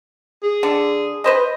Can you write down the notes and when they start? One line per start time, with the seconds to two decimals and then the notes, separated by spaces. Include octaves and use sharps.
0.43 G#4
0.63 D3
1.24 B4 C5 D#5